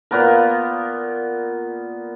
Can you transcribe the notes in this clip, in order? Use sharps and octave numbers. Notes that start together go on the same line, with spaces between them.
A#2 B3 A#4